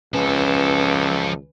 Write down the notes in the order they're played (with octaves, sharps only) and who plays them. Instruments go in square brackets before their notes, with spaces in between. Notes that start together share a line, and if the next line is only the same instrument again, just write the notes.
[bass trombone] C#2 [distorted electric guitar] F3 A4 [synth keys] C#4 B4 G#5